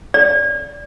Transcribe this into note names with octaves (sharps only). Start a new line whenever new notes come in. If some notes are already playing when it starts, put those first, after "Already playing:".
D5